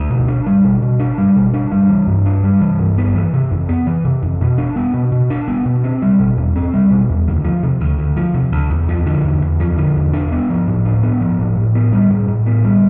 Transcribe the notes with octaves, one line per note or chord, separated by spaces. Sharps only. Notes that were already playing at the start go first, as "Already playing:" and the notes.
Already playing: D2
B2
D4
G3
B2
B2
D4
G3
B2
D4
G3
E3
G2
D4
G3
E3
G2
B3
E3
C3
F2
B3
E3
C3
F2
B2
D4
B3
B2
B2
D4
B3
B2
C4
G3
B2
E2
C4
G3
B2
E2
D2
F3
C3
D2
D2
F3
C3
D2
E2
F3
D3
E2
E2
F3
D3
E2
D4
B3
F3
A2
D4
B3
F3
A2
A2
B3
G3
A2
A2
B3
G3